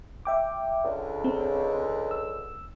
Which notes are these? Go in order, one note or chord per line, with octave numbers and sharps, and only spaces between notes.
E5 G5 D6
C#2 D3
C4
E6